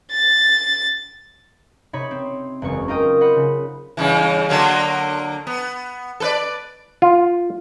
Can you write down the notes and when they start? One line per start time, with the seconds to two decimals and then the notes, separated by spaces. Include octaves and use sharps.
0.11 A6
1.93 C3 D#4 C#5 B5
2.11 C4
2.62 F#1 E2 G#3 C#6
2.88 D#4 F4 A#4 D#5 G5 D#6
3.21 C5 D#5 F#5 B5
3.36 C#3
3.97 G2 C#3 E3
4.49 D3 F#3 A#3
5.47 B3
6.20 A4 B4 D5
7.02 F4